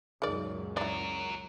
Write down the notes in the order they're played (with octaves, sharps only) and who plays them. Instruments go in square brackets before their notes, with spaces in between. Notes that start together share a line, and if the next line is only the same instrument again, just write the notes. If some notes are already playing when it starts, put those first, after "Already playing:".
[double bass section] C#2 F#2 A#2 [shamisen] D#3 D5 [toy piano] G#4
[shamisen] E4 D5 [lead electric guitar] F#4 A#4